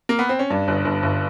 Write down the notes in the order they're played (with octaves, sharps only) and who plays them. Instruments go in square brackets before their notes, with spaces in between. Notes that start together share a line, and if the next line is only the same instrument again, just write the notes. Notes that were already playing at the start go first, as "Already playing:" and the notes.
[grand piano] A#3
B3
C4
C#4
[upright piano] G2 [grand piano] D4
[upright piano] G1
G1
G1